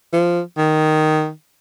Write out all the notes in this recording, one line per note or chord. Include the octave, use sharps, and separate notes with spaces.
F3
D#3